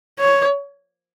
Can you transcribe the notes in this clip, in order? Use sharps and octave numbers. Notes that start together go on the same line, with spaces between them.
C#5